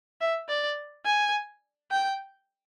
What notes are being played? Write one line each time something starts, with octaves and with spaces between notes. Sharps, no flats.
E5
D5
G#5
G5